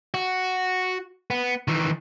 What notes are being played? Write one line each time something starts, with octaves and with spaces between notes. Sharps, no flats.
F#4
B3
D#3 E3